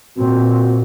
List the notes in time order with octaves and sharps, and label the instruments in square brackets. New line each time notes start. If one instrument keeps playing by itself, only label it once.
[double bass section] A#2 [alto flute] C4 [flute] F#4